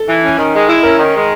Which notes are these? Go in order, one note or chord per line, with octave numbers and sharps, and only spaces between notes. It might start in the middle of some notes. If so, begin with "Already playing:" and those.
Already playing: A4
E3
C#4
D#3
G#3
E4
C#4 A#4
D#3
G#3